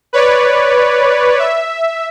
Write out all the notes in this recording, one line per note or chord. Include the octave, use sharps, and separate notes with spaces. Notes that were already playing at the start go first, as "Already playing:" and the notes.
B4 C#5 D5
E5